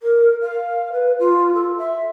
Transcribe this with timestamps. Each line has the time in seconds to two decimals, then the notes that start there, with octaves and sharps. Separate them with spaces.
0.02 A#4
0.41 F5
0.93 B4
1.19 F4
1.54 A4
1.78 E5